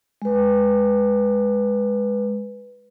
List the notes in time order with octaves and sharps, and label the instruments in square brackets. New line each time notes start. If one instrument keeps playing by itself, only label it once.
[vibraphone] G#3 B4